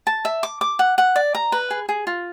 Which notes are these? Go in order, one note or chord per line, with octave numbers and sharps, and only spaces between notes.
A5
E5
D6
D6
F#5
F#5
D5
A#5
B4
G#4
G#4
F4